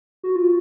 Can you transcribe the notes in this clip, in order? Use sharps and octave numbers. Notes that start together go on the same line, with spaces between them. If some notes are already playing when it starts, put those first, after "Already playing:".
F#4
F4